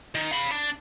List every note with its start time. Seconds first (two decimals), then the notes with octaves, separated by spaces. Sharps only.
0.15 D#3
0.31 F5 B5
0.51 D4